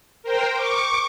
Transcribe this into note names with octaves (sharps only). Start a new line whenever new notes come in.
A#4 C5 G5
C#6 D6